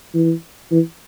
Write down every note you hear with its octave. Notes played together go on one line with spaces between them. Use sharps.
E3
E3